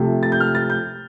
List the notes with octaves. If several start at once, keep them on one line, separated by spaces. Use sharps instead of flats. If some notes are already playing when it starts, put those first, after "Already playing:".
Already playing: C3 F3 A3
A6
G6
F6
A6
G6